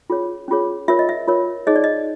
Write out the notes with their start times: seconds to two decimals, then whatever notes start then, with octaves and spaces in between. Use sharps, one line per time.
0.10 C#4 F4 G#4 C#5
0.48 C#4 F4 G#4 C#5
0.88 F4 A#4 C#5 E5
0.99 D#5
1.09 E5
1.28 F4 A#4 C#5
1.67 D#4 G#4 C#5 D#5
1.76 D5
1.84 D#5